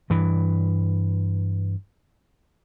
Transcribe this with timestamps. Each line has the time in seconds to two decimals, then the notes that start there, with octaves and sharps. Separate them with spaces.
0.10 G2 E3